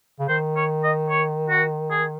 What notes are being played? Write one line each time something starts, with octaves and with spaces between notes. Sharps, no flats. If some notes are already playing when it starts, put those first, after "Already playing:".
C#3
D#3 C5
C#5
D#5
C#5
F#4
G#4